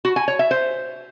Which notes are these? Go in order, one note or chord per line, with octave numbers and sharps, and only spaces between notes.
F#4
G#5
C#5
E5
C5